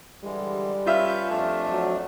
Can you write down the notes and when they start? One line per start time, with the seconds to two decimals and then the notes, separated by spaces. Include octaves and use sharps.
0.24 D3 E3 G3 G#3
0.86 C#4 F4 B4 E5 F6 G6
1.29 F2 A3 D4
1.71 F#3